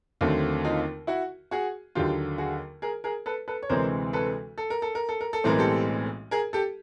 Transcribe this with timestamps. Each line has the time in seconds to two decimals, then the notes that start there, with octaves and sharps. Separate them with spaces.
0.21 D#2 D3 F#3 A3 C4
0.64 D#4 F4
1.07 E4 F#4
1.51 F#4 G#4
1.95 D#2 D3 F#3 F4 G4
2.38 F#4 G#4
2.82 G#4 A#4
3.04 G#4 A#4
3.26 A4 B4
3.48 A4 B4
3.62 C#5
3.69 D2 C3 E3 G#3 C4 A#4 C5
4.13 A4 B4
4.58 A4
4.70 A#4
4.82 A4
4.95 A#4
5.09 A4
5.21 A#4
5.33 A4
5.44 B1 A2 E3 G#3 C4 A#4
5.59 G4 A4
6.31 G#4 A#4
6.53 G4 A4